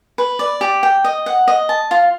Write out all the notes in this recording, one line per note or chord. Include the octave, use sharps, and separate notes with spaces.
B4
D5
G4
G5
D#5
F#5
D#5
A5
F4